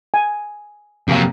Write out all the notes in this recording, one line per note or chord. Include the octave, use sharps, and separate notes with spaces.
G#5
F2 C3 F#3 A#3 F5